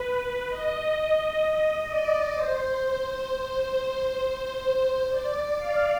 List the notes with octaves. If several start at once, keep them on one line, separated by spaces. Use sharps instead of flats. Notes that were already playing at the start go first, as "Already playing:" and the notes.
Already playing: B4
D#5
D#5
D5
C5
C5
D5
F5